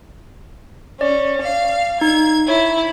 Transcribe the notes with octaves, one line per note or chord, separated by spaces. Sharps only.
C#4 D5
F5
D#4 G#6
E4 C#5